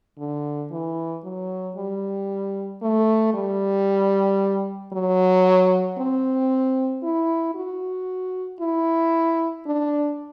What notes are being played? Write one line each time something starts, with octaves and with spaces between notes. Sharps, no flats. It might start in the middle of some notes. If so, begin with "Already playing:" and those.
D3
E3
F#3
G3
A3
G3
F#3
C4
E4
F#4
E4
D4